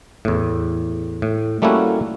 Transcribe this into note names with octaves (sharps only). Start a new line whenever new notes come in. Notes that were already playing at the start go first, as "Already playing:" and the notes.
E2 A2
A2
G3 A3 A#3 C#4 E4 F#4